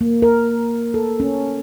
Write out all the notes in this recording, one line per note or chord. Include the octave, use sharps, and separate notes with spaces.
A#3
A#4
A4
C#4